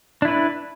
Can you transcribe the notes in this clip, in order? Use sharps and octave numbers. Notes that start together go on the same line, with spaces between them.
D4 E4 B4